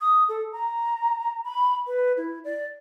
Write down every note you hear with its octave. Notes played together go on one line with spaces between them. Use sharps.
D#6
A4
A#5
B5
B4
E4
D5